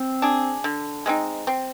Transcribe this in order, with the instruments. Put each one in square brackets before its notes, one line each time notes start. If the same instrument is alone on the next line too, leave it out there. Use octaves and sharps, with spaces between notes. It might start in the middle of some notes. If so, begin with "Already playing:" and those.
Already playing: [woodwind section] C4
[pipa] D4 G#4
D3
G#3 C4 D#4
C4